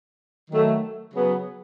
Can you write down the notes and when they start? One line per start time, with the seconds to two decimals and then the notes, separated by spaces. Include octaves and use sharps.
0.51 D#3 F#3 A3
1.13 C#3 F#3 B3